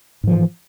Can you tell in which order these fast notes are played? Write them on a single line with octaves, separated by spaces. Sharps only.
G#2 F3 E3